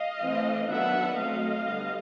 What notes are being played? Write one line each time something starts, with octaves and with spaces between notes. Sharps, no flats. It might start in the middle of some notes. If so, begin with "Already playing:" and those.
Already playing: D#5 F5
E3 A3 C4
D#3 F#3 B3 D4 E5 F#5
F#3 A3 C4 D#5 F5
D3 G3 B3